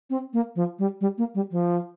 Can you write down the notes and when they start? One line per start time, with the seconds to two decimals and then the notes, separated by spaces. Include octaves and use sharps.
0.10 C4
0.33 A#3
0.56 F3
0.79 G3
1.01 G3
1.18 A#3
1.35 G3
1.51 F3